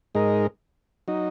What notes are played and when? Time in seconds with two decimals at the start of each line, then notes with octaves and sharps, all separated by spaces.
0.15 G#2 G#3 D#4 A#4
1.08 F#3 D#4